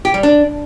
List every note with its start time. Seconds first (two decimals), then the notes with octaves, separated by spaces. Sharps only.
0.05 G4
0.14 G3
0.23 D4